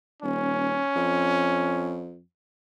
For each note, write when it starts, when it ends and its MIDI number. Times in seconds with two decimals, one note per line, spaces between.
0.22 0.82 27
0.22 2.05 61
0.95 2.22 41